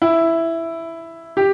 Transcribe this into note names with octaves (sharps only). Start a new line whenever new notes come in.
E4
G4